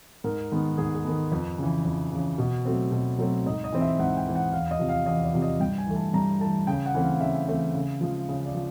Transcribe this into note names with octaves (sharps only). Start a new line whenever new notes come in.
G#2 A#4
D#3 G#3 B3
G#2 G#4
G#4
D#3 G#3 B3 A4
F2 B4
C#3 E3
F2
C#3 E3
B2
F#3 A3 C4
B2
F#3 A3 C4
G#2 D#5
D#5
E3 G#3 C4
E5
G#2 F#5
G5
E3 G#3 C4
F#5
E2 F5
D#5
C3 F3
F5
E2 D#5
D5
C3 F3
D#5
G2 G5
G#5
E3 A3
A5
G2 A#5
E3 A3 A5
C#3 G5
F#5
E3 A3 C4
F5
C#3 E5
E3 A3 C4
C#3
F3 G#3
C#3
D5
F3